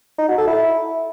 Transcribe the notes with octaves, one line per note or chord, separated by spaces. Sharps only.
D#4
F#4
A4
E4